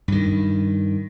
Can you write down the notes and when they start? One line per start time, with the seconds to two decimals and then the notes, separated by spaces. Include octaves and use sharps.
0.08 G2 D#3